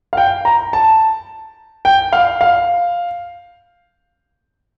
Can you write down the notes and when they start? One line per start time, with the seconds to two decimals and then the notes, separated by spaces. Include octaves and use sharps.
0.13 F5
0.17 G5
0.45 A#5
0.73 A5
1.85 G5
2.13 F5
2.41 F5